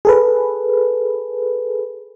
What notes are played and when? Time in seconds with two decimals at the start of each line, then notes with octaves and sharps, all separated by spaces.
0.05 G#4 A4 B4